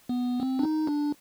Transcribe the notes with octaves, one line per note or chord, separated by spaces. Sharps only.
B3
C4
D4
D#4
D4